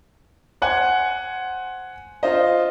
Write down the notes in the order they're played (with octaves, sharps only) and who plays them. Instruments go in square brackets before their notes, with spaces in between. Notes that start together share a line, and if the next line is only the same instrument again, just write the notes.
[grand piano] C5 F#5 G#5
[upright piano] F4 C5 D#5